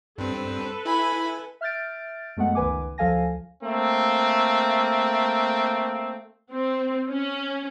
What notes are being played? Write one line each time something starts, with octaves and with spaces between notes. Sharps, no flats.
G2 C4 A4 B4
E4 G#5 B5
E5 F6 G6 A6 D7
F#2 G#3 A3 B3 F#5
C#2 D#3 B4 G#5 D6
D2 F3 A4 F5 G#5 A#6
A3 A#3 C4
C4
C#4